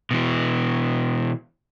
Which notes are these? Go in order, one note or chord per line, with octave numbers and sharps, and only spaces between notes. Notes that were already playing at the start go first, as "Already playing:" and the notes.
B2 E3